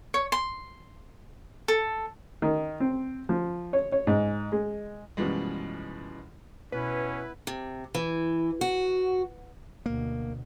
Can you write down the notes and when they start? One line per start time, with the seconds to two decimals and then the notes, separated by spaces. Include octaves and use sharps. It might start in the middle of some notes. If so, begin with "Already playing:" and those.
0.14 C#5
0.32 C6
1.68 A4
2.42 D#3
2.80 C4
3.29 F3
3.73 C#5
3.92 C#5
4.07 G#2
4.52 G#3
5.17 F#2 B2 E3 F3 G3 G#3
6.72 B2 C#4 E4 B4
7.47 C3
7.95 E3
8.61 F#4
9.86 D2 B2 A#3